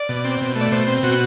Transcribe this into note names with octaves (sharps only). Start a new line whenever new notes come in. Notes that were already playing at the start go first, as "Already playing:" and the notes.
Already playing: D5
B2
C4
B2
A3
D5
B2 C5
C4
B2 F#4